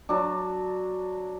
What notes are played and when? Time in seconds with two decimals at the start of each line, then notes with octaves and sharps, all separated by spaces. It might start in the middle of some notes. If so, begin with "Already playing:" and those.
0.09 F#3 D4